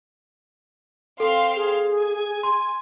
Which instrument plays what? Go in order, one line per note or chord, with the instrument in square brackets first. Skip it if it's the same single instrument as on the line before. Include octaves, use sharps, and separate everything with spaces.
[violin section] C4 F5 C6 [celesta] A4
[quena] G#4
[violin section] G#5
[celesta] C6